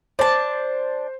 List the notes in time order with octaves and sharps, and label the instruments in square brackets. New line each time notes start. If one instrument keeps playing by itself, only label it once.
[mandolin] D4 A5 [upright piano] C5